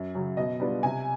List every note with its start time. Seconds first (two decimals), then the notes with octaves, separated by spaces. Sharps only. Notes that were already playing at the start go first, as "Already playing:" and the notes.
Already playing: F#2
0.15 C#3 F#3
0.37 B2 D#5
0.60 G3 B3 D4 F4
0.83 C3 G#5